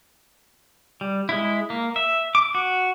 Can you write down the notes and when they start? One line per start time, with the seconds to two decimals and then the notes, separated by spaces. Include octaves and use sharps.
1.01 G3
1.29 G#3 E4
1.70 A#3
1.96 E5
2.35 D6
2.55 F#4